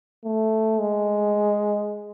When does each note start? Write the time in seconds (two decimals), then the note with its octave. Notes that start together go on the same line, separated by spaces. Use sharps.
0.25 A3
0.80 G#3